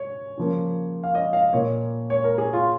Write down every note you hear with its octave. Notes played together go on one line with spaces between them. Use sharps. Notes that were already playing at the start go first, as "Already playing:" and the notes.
Already playing: C#5
C#3 F3 A#3
F5
D#5
F5
A#2 A#3 C#5
C#5
A#4
G#4
F4